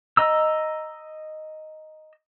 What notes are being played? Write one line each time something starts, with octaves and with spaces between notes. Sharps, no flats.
D#5 A#5 E6